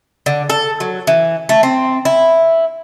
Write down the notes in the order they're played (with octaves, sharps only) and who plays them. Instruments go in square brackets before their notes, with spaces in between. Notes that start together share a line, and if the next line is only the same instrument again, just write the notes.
[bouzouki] D3
A4
F#3
E3
A3
C4
E4